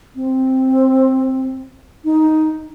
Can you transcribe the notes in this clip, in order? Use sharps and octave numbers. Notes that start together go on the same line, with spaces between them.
C4
D#4